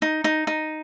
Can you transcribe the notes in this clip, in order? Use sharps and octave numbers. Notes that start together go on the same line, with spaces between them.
D#4
D#4
D#4